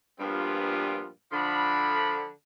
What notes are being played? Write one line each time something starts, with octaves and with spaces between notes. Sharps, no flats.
G2 A#2 F3 G3 B3 F4
D3 F3 B5